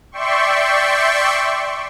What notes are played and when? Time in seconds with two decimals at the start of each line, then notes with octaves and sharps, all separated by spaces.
0.12 D5 E5 G5 C6 C#6